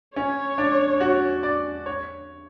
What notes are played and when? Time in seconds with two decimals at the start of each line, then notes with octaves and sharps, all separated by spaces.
0.16 C#4 C#5
0.58 D4
1.00 F#4
1.43 D5
1.86 C#5